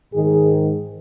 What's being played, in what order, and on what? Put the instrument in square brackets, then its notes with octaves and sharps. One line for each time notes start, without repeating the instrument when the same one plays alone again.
[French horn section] G#2 D#3 G#4